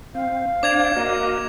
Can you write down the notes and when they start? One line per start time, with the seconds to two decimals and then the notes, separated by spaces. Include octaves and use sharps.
0.15 C4 F5
0.63 D4 C5 D5 D6 G#6 F7
0.96 A#3 F#4 D#5